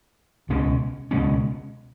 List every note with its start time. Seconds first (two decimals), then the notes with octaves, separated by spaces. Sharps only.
0.49 C#2 B2 G#3 C#4
1.11 C#2 B2 G#3 C#4